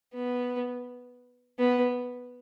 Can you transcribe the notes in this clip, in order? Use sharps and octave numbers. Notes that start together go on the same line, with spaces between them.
B3
B3